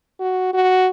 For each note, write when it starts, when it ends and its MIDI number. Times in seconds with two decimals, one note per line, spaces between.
0.20 0.52 66
0.53 0.89 66